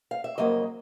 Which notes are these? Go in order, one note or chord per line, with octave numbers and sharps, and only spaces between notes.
F5
E5
F2 C#3 F#3 A#3 D#5